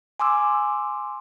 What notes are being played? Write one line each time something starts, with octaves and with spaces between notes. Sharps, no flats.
G#5 C6 D6 E6